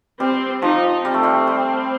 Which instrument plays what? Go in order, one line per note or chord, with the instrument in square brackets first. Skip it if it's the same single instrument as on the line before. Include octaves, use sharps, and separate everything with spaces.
[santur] G3 [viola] C4
[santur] F3 [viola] D#4
[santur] G3 [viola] C4
[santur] A3
G3
G3